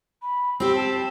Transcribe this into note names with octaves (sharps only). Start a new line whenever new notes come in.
B5
C4 G4 E6
A5